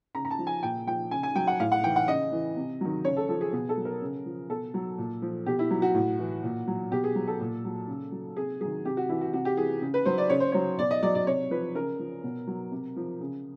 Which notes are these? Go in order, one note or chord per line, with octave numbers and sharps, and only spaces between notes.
C#3 A#5
A#5
A5
F3
G#5
A#2 G5
F3 G5
C#3 G#5
G#5
F#3 G5
F#5
A2 F5
F#5
E3 G5
F#5
C#3 D#5
E3
C3
D#3 F#3
C#3 C#5
A4
F3 A4
G#4
B2 G#4
A4
F#3
A#4
C#3
F3
B2 A4
F#3
A#2
F3
B2 G4
E4
F#3
F#4
A2
E3
A#2
F#3
B2 G4
G#4
F#3
A4
A#2
F#3
C#3
F#3
C3 G#4
D#3 F#3 G#4
C3 G4
F#4
E3 E4
F#4
C3 F#4
G4
E3 G#4
C#3
B4
F#3 C5
D5
C#3 C#5
C5
F#3 C#5
B2 D5
D#5
F#3 D5
D5
C3 C#5
F3 B4
C#3 A#4
F3
B2
F#3
C3
F3
C#3